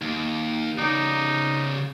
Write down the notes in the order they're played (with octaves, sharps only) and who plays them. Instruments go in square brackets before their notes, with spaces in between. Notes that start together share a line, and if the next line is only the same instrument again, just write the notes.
[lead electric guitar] D#2
[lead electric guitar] C#3 D5 [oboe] D#4